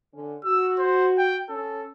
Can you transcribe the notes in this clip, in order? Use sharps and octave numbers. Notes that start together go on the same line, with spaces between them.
D3 C#4
F#4 E6
C5
G5
C#4 A4